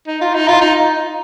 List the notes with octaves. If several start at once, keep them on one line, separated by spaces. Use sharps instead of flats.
D#4
F4
D#4
F4
D#4